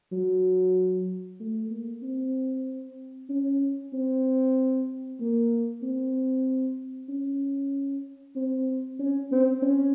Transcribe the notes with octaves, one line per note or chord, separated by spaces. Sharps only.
F#3
A3
A#3
C4
C#4
C4
A#3
C4
C#4
C4
C#4
C4
C#4